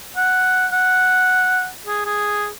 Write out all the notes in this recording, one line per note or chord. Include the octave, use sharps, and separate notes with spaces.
F#5
F#5
G#4
G#4